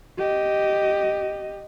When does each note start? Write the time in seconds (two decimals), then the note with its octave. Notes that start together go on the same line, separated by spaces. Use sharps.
0.18 G4 D#5